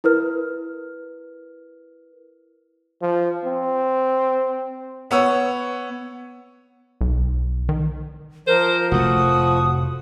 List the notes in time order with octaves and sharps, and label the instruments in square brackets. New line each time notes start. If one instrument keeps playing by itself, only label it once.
[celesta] E4 A#4 B4 F6
[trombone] F3
C4
[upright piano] B3 C#5 E6
[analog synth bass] B1
D#3
[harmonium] F3 [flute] A#4 [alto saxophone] C5
[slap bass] F1 A2 A3 [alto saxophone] F#4 [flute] D#6